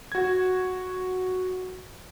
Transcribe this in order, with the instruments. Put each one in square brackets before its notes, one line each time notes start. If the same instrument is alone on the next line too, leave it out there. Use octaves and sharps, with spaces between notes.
[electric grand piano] F#4 G#6